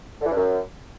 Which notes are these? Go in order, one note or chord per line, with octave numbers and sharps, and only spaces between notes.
D3
E3
G2
F#2